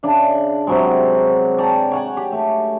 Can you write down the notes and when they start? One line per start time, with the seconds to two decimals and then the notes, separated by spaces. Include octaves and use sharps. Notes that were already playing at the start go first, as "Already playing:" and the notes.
0.03 C#3 D4 E5
0.67 C3 F#3 G#3
1.58 D5 G5 A5 A#5
1.91 C#5 F#5 G#5
2.17 G4
2.32 A3